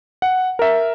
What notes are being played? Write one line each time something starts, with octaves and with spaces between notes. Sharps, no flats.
F#5
A#4 E5